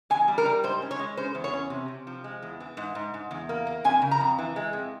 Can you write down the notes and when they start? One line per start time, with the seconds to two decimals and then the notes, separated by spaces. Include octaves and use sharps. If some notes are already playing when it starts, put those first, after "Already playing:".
0.10 E2 G#5
0.28 G3
0.38 A#4
0.46 G3
0.63 G#2 C5
0.82 C#4
0.91 C#5
0.99 G#3
1.17 C#4 C5
1.35 E2
1.44 C#5
1.54 C#4
1.70 C3
1.88 C3
2.07 F3
2.24 G#3
2.42 E2
2.60 E3
2.77 G#2
2.95 G#2
3.14 G#2
3.31 E2
3.49 A#3
3.67 A#3
3.84 F2 G#5
4.02 C#3
4.11 A#5
4.21 F2
4.39 E3
4.56 G#3
4.73 F2